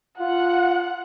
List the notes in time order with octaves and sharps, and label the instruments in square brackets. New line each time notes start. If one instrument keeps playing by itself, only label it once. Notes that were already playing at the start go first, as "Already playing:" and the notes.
[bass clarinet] F4 [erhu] F#5